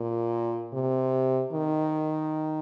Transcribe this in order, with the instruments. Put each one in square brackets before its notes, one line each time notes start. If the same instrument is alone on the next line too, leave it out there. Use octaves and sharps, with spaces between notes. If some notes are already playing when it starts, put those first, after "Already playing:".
Already playing: [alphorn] A#2
C3
D#3